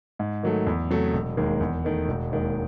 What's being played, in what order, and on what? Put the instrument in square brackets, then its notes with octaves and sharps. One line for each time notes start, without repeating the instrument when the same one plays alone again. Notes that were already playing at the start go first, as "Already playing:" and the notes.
[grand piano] G#2
D#3 F#3 A3
E2
C3 F#3 A3
E1
D#2 D#3 G#3
E2
D#3 A3
E1
D#2 D#3 G#3